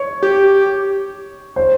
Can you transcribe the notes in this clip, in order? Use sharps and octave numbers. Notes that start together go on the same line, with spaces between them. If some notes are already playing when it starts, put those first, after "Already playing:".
Already playing: C#5
G4
C5